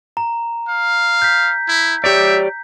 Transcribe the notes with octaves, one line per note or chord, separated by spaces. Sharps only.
A#5
F5
G6 B6
E4
G4 C#5 D5 E5